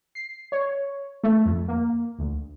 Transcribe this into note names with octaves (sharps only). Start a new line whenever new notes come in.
C7
C#5
A3
F2
A#3
D2